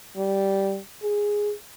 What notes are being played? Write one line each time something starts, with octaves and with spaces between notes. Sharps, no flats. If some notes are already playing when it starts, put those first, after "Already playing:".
G3
G#4